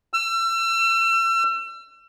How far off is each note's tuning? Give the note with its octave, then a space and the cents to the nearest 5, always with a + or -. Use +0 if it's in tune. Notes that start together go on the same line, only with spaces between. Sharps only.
E6 +35